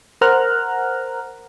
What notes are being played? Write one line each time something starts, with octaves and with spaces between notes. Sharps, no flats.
A#4 C5 F#5 A#5 F6 F#6